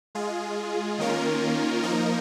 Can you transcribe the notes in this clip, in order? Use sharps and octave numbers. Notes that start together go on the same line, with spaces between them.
G#3 F4 G#4
D#3 A#3 C#4 F4 A#4
F3 A#3 D#4 A#4